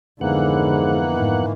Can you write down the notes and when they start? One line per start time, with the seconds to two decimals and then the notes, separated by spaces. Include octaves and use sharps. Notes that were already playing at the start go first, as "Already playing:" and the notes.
0.21 F2 G#2 D3 E3 A#3 B3 F#5
1.12 G#2 D#3